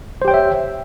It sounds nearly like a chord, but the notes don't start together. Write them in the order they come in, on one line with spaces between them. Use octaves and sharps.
C5 G4 G5 C#5 E5